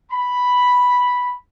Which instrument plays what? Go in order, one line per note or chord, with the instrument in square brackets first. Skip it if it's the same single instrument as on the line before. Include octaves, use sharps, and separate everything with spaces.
[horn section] B5